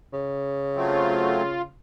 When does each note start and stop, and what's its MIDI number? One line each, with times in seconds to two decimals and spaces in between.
0.13 1.72 49
0.76 1.42 54
0.76 1.42 57
0.76 1.42 60
0.76 1.62 65